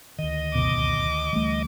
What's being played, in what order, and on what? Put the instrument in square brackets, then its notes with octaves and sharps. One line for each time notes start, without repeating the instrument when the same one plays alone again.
[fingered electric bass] D2 D#3 [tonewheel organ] D#5
[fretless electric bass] F#1 C#2 B2 [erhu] D6
[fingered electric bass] D2 G3 [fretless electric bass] E3 A3